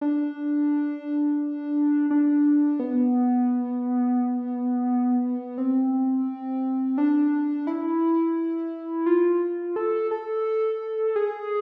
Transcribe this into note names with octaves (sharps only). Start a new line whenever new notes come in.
D4
D4
B3
C4
D4
E4
F4
A4
A4
G#4